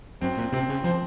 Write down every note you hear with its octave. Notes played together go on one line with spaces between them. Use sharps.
F#2 C4
A#2
C3 C4
C#3
F3 C5